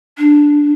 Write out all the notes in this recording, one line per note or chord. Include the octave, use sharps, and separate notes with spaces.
D4